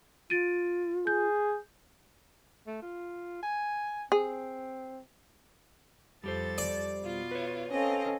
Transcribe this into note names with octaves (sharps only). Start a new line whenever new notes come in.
F4 A6 D7 D#7
G#4 G6
A3
F4
G#5
C4 G#4
F2 G3 G4 A4 C5 A6
D5
B2 F4
B4 C#5
C4 C#4 A4 D#5 F5